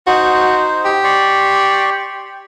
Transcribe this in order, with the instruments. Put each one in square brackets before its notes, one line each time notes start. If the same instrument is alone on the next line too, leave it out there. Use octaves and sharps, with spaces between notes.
[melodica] D#4 C5 [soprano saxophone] F#4
[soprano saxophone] G4
[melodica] D5 C6 C#6